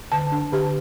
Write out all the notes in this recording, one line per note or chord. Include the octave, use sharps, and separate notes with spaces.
D3 A5
D4
D3 G4